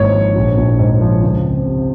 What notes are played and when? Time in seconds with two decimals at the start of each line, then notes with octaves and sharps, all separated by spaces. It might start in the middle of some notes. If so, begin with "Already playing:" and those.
Already playing: G#1 G#2 A#3 C#5
0.14 F3
0.36 A#1
0.58 A#1
0.79 G#2
1.01 F3
1.23 C#2
1.45 C4
1.66 C3